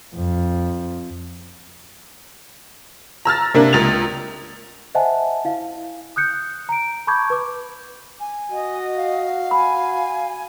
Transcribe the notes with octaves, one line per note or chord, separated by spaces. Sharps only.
F2
A#5 E6 F6 A6
C3 A#3 D4
C#2 A#4 A6 F7
C5 D#5 E5 F#5 G#5 A5
E4 F5
D#6 F#6 G6 C#7
A#5 D7
A5 B5 C#6 D6 G6 G#6
B4 D6
G#5
F#4 D#5
F5
G#5 B5